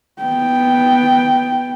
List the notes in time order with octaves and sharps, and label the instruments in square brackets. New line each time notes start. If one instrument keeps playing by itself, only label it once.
[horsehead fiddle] B3 G5